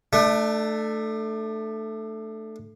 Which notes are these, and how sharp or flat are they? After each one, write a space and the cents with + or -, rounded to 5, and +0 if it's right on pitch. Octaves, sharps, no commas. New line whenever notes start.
A3 +0 D4 +30